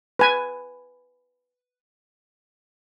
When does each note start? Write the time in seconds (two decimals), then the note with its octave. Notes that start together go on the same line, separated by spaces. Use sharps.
0.19 B4 G#5